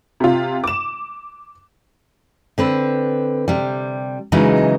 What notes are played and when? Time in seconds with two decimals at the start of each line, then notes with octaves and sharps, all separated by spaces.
0.20 C3 F4
0.64 D6 E7
2.58 D3 C4 B4
3.48 C3 G3
4.32 C#3 E3 F#3 G#3 D#4